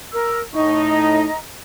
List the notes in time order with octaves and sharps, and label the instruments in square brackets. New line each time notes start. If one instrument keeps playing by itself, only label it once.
[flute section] A#4 E6
[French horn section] A2 D#4 [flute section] D#5 C#6
[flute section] D#5 A#5